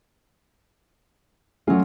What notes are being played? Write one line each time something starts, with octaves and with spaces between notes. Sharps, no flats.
F#3 A3 C#4 F4